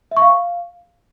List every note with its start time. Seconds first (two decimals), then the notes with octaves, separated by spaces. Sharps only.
0.11 E5
0.17 C#6
0.22 F5